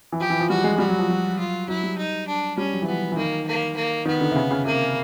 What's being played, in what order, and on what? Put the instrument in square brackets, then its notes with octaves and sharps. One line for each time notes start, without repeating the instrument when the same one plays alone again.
[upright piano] E3
[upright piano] F3 [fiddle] G4
[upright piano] E3
F3
[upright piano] G3 [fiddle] F#4
[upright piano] G#3
[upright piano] G3 [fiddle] F#4
[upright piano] F#3
F3
F#3
[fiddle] F4
[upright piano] F#3 [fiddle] E4
[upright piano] G3
[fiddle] D#4
D4
[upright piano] G3 [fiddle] C#4
[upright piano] F#3
E3
[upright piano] F3 [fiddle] B3
[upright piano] E3
[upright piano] D#3 [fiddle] A#3
[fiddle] A#3
A#3
[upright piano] D#3 [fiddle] B3
[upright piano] D3
C3
C#3
C#3
[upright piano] C3 [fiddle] A#3